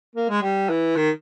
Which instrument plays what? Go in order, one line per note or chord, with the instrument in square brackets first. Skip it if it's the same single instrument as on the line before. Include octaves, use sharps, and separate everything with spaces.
[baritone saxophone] A#3
G#3
G3
E3
D#3